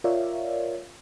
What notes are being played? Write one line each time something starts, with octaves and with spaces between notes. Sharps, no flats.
F4 A#4 C#5 D5 E5 F5